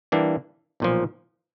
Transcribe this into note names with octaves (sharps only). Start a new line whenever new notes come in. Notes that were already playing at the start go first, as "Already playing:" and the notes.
E3 G3 A#3 D4 G4
B1 A#2 F3